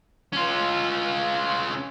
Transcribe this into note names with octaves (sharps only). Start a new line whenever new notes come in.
C#4 F4